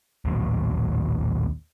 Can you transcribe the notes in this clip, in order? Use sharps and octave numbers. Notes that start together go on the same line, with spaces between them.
A#1 D#2 A2 F#3